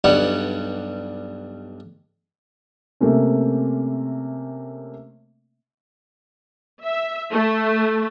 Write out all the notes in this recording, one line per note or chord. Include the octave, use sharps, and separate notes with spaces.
B1 G2 G3 F#5 C#6
C3 A3 A#3 C4 C#4
E5
A3